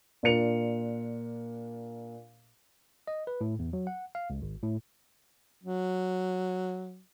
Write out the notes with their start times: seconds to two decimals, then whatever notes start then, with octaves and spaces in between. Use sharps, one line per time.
0.23 A#2 D4 A#4 C#7 F7
3.07 D#5
3.27 B4
3.41 A2
3.59 E2
3.73 F#3
3.87 F#5
4.15 F5
4.30 C#2
4.42 G#1
4.62 A2
5.64 F#3